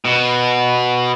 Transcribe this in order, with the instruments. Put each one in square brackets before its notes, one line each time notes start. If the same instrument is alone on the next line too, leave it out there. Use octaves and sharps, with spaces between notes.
[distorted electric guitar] B2